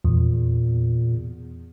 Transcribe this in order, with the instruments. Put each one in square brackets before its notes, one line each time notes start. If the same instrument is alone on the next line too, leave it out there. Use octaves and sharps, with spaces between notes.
[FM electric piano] E2 [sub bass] A#2